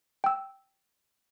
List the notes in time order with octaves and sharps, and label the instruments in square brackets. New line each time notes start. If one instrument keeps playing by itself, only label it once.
[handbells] G5 E6